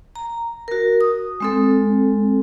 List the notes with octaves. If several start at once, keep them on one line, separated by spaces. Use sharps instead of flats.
A#5
F#4 A#4
D#6
G#3 C4 A4